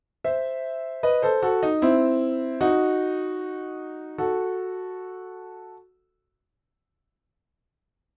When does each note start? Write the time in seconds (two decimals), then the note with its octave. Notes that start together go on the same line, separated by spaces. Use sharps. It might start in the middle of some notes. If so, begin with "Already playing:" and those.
0.24 C5 E5
1.03 B4 D#5
1.22 A4 C5
1.42 F#4 A4
1.63 D#4
1.82 C4 E4
2.61 D#4 F#4
4.18 F#4 A4